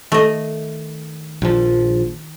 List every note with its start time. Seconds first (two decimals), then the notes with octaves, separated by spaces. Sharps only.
0.12 D#3 A3 D#5
1.42 A#1 F3